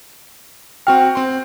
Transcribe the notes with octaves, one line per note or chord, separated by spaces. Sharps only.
C4 F#4 G5 F6
C4 C6